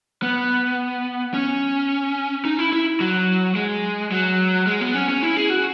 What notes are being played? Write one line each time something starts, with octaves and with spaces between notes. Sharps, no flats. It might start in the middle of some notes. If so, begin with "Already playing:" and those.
B3
C#4
D#4
E4
E4
F#3
G#3
F#3
G#3
B3
C#4
C#4
E4
G#4
F#4